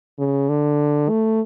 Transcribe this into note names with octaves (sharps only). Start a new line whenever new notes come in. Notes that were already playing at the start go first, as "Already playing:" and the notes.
C#3
D3
A3